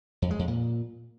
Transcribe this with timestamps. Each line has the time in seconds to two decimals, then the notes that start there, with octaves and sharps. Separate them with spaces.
0.22 F2
0.31 G#3
0.39 F2
0.48 A#2